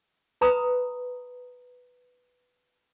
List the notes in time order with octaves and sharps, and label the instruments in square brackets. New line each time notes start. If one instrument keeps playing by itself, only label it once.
[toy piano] B4 A#5 B5 D#6